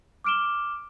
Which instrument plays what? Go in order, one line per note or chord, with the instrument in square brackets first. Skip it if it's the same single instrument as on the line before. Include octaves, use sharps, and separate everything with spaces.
[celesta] D6 F6 D7 E7 G7